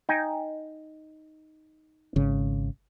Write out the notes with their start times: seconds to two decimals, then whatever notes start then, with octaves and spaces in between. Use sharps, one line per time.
0.09 D#4 G5 G#5
2.16 G#1 C#3